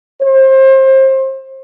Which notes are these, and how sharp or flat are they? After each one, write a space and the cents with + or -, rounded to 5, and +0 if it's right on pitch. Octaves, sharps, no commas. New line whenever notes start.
C5 +30